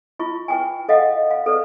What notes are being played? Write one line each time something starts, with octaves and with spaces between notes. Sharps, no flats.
E4 F4 C#6
B4 G5 G#5
A4 D#5 F5 F#5
F5
A4 B4 D5